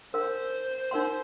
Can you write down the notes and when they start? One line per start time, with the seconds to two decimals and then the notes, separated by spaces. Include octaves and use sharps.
0.14 D#4 A#4 C5 F5 C6
0.91 D#4 A#4 F5 C6